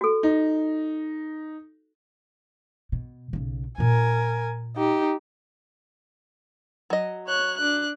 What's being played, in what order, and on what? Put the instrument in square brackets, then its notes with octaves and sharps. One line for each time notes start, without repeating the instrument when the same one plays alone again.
[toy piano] F#4 A4
[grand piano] D#4
[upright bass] B2
B1 C#3
[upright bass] A#2 F4 [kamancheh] A#4 G#5
[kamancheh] D#4 G4
[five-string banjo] F#3 D#5
[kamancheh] C#5 F#6
D4 F#6